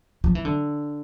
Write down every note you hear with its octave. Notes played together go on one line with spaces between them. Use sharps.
F3
E3
D3